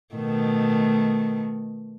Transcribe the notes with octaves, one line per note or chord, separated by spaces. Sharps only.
B2 D#3 A3